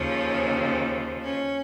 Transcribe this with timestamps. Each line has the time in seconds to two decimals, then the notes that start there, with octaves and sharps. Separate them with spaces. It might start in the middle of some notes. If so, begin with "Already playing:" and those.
Already playing: D#2 C#3 F3 C#4
1.23 C#4